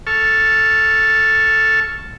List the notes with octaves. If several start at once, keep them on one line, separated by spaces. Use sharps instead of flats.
A4 A5 C#6 F6